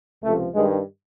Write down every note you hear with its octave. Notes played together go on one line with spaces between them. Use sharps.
C#2 C3 F3 A3
G2 D#3 G#3